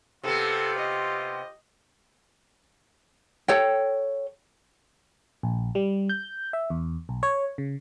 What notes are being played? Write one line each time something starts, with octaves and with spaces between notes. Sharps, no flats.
C3 B3 F4 G4 A4
D#5
A4 C#5 G5
A#1
G3
G6
E5
E2
B1
C#5
C#3